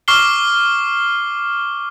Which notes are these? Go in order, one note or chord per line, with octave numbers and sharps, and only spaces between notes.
C#6 D6 F6 C7 G7